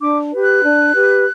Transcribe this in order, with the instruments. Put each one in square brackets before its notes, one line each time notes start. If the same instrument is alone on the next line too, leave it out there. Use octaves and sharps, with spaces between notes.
[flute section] D4 D6
G4 B4
F#6
D4
G4 B4